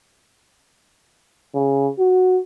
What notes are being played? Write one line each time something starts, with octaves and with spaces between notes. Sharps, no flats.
C#3
F#4